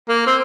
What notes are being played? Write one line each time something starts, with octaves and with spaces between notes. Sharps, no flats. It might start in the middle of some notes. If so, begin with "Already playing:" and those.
A#3
C4